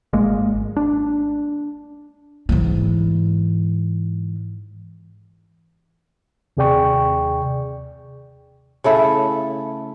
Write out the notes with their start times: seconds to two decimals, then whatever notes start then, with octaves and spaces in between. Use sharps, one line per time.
0.13 G#1 G#3 A#3
0.77 D4
2.49 G#2 E3
6.57 D#2 C3 G#4 D5 G5 C#6
8.84 C#3 A3 E4 A4